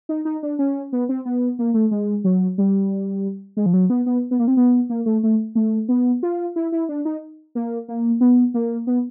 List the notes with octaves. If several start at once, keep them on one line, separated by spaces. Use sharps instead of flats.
D#4
D#4
D4
C#4
B3
C4
B3
A#3
A3
G#3
F#3
G3
G#3
F3
F#3
B3
B3
B3
A#3
C4
B3
A#3
A3
A3
A3
B3
F4
E4
E4
D4
D#4
A#3
A#3
B3
A#3
B3